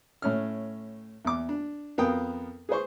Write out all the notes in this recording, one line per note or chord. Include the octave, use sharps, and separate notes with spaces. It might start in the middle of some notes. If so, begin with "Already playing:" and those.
A2 C#4 F6
E2 D6
D4
F2 B3 A#4 F5 G5 D#6
G#4 B4 C5 C#6